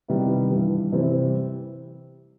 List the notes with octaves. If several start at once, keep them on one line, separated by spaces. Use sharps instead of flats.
C3 D#3 G3 B3 E4
G2 E3 G3
C3 E3 G3 C4